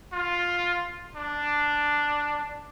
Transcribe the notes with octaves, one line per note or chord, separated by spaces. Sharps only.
F4
D4